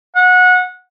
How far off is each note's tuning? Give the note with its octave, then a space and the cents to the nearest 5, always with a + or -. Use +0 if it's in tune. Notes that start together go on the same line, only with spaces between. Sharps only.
F#5 -25